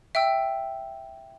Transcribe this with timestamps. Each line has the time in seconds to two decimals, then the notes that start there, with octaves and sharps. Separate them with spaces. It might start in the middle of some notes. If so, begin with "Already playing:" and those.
0.15 E5 G5 E6